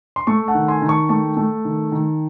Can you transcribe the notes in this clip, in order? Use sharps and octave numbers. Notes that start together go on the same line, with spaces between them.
C6
A3 A5 C#6
F#5 A5
D#3
G#5 C6
D#3
A5 C#6
A3 A5 C#6
A3
D#3
D#3